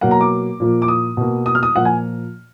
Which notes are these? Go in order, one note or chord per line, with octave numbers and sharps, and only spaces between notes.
B2 F#3 A#3 F#5
A#5
D6
A#2 F3 A#3
D6
D#6
B2 A#3
D#6
F6
D#6
A#2 F3 A#3 F#5
G#5